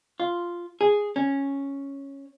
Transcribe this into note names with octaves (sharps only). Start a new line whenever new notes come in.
F4
G#4
C#4